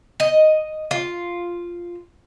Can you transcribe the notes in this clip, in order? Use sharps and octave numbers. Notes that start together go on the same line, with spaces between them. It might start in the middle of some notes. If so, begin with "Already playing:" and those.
D#5
F4